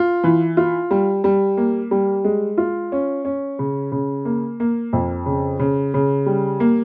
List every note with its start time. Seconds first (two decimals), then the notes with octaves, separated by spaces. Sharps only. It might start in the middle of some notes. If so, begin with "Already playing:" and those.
Already playing: F4
0.24 E3
0.57 F4
0.91 G3
1.24 G3
1.57 A#3
1.91 G3
2.24 G#3
2.58 F4
2.92 C#4
3.25 C#4
3.59 C#3
3.92 C#3
4.25 A#3
4.60 A#3
4.93 F2
5.26 C#3
5.59 C#3
5.94 C#3
6.26 G3
6.60 A#3